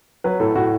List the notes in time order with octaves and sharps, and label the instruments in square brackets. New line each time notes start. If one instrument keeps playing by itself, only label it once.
[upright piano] F#3 B4
A2 A4
A2 F#4